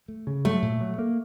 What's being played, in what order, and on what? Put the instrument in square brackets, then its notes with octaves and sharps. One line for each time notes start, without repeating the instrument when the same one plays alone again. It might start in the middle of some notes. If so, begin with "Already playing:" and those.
[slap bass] A3
C#3
[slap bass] F#3 [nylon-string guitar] A3
[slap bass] A#2
F#3
A#3